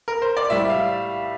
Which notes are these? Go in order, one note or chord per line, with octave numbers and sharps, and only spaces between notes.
A#4
C5
D5
A2 G3 E5
F5